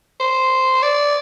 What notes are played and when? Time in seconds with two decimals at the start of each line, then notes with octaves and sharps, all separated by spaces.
0.20 C5
0.83 D5